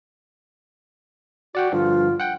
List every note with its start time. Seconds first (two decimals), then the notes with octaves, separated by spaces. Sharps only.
1.55 F#4 D5 F#5 G5
1.72 G2 D3 F3 F4
2.20 F#5 G5